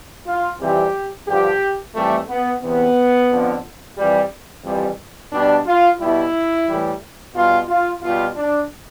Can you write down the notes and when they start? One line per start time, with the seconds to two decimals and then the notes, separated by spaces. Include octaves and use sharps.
0.26 F4
0.60 F2 C3 E3 G3 G4
1.28 G2 D3 F3 G4
1.95 F2 E3 G3 A3
2.29 B3
2.62 E2 C3 E3 B3
3.30 F2 D3 F3
3.97 F2 E3 G3
4.64 F2 E3 G3
5.32 B2 G3 D4
5.66 F4
6.00 B2 G3 E4
6.67 A2 E3 G3
7.35 B2 G3 F4
7.69 F4
8.03 B2 G3 F4
8.36 D4